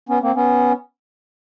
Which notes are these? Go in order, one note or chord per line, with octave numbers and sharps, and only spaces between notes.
B3 C#4
A#3 C4
B3 C#4